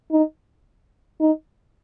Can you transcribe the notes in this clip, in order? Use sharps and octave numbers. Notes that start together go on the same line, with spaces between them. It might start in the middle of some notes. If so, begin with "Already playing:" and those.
D#4
D#4